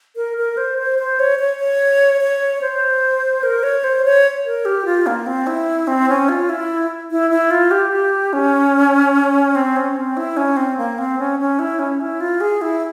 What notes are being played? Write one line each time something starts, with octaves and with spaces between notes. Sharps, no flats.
A#4
A#4
C5
C5
C5
C#5
C#5
C#5
C#5
C5
A#4
C#5
C5
C#5
A#4
G4
F4
A#3
C4
E4
C4
C#4
F4
E4
E4
E4
F4
G4
G4
C#4
C4
C#4
C4
E4
C#4
C4
A#3
C4
C#4
C#4
E4
C#4
E4
F4
G#4
E4